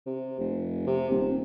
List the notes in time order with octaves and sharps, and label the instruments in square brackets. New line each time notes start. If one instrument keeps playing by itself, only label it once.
[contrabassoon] C3
F1
C3
D#1